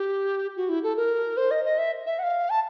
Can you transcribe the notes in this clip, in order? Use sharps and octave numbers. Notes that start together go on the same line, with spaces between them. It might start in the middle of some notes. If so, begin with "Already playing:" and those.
Already playing: G4
F#4
E4
A4
A#4
C5
D#5
D#5
E5
E5
F#5
F5
A5